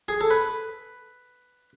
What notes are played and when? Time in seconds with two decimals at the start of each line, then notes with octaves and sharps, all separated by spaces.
0.08 G#4
0.21 A4
0.30 B4